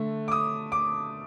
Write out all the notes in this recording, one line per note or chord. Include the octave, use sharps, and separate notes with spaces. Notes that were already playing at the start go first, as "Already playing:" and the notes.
Already playing: D3 A3
D6
D#6
D6